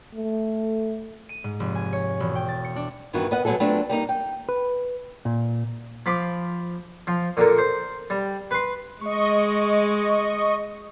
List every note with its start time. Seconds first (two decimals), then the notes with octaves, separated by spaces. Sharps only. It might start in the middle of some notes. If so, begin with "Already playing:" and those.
0.14 A3
1.29 D#7
1.44 G#2
1.60 F1
1.75 G#5
1.93 C#5
2.20 E1
2.35 G5
2.48 A6
2.64 C#7
2.76 D4
3.13 G2 D#3 E3 B3 F#4
3.31 B3 D#5 F#5
3.45 B2 F#3 G#3 G#4 A4
3.60 F#3 A3 B3 C4 D4 F4
3.89 G3 A#3 D#4 D#5
4.09 G5
4.49 B4
5.25 A#2
6.06 F3 B5 D6
7.07 F3
7.37 A#2 D3 A#4
7.58 C5
8.10 G3
8.51 B4 C6
9.01 G#3 D#5 C#6